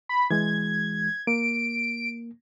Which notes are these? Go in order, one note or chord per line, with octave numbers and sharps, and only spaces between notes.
B5
E3 G#3 G#6
A#3 D7